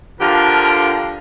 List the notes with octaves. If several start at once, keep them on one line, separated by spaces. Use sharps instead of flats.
D3 F3 F4 G4 A#4